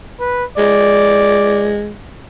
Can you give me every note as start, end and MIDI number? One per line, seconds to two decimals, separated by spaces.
0.20 0.44 71
0.58 1.93 56
0.58 1.74 74